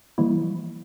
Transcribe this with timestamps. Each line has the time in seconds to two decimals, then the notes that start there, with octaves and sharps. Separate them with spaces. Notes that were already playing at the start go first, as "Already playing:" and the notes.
0.18 E3 F3 G3 G#3 A#3 E4